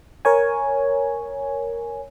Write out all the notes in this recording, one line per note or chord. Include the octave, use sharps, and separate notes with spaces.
A#4 C#5 G#5